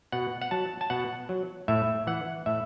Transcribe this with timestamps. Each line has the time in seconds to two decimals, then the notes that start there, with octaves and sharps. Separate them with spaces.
0.12 B2 F#5
0.41 F#5
0.51 F#3 A5
0.81 A5
0.90 B2 F#5
1.29 F#3
1.68 A2 E5
2.07 E3 F#5
2.46 A2 E5